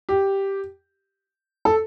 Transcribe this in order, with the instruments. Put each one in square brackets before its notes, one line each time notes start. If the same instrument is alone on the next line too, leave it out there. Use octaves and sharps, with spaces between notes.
[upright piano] G4
A4